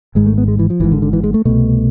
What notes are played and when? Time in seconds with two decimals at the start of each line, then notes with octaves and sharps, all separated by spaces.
0.15 G#1 G#2 G#3
0.26 A3
0.38 B3
0.48 G#3
0.59 E3
0.70 F3
0.80 G#1 G#2 E3
0.92 D3
1.02 D3
1.13 E3
1.24 G#3
1.34 A3
1.45 C2 B2 A3